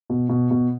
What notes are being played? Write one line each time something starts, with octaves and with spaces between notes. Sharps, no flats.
B2
B2
B2